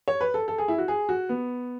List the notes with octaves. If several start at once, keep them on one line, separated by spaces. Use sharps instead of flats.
C#5
B4
A4
A4
G#4
E4
F#4
G#4
F#4
B3